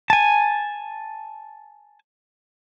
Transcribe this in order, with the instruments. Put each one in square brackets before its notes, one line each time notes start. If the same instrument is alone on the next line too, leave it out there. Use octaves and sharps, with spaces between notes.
[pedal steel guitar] G#5 A5